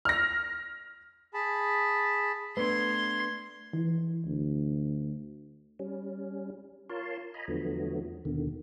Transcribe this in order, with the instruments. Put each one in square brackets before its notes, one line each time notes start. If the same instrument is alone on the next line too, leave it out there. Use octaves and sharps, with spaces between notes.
[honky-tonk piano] F6 A#6
[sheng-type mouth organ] G#4 A5 B5
[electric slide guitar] A3 B3 D4 [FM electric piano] B4 [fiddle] C6 [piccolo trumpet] G#6
[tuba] E3
D2
[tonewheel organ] G3 C#4
F4 A#4 C#5 A5 C6
D#5 G#5 A#5 B5
E2 D3 F3 F#3 A3 B3
D#2 B2 D3 D#3